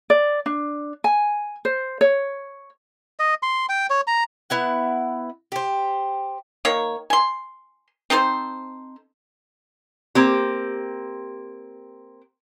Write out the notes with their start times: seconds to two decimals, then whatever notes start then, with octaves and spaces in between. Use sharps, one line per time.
0.10 D5
0.46 D4
1.04 G#5
1.65 C5
2.01 C#5
3.20 D#5
3.43 C6
3.69 G5
3.90 C#5
4.07 A#5
4.50 B3 E4 F#5
5.52 G4 C5
6.65 D#3 A#3 C#5
7.10 G#5 C6
8.10 C4 D#4 A4 C5
10.15 A#3 C4 G4